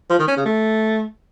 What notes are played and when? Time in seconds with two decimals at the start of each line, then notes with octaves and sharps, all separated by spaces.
0.10 F3
0.19 D#3
0.28 C#4
0.37 C#3
0.46 A3